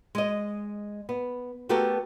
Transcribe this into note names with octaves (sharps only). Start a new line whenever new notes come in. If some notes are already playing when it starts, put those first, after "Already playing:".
G#3 D#5
B3
A3 B3 F#4 G4 A4 A#4